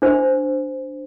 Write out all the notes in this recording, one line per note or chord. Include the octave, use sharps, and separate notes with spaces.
D4 C5